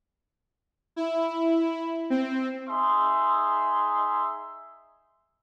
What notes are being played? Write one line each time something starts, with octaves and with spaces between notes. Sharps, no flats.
E4
C4
D#4 G#4 E5 C6